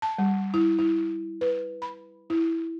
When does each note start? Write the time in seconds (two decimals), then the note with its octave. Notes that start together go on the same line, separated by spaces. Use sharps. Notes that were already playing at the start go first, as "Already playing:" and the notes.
0.02 A5
0.18 G3
0.54 E4
0.79 E4
1.41 B4
1.82 B5
2.30 E4